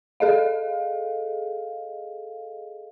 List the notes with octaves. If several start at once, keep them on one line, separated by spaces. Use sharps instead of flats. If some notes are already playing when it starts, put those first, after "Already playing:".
G#4 A4 D#5 F5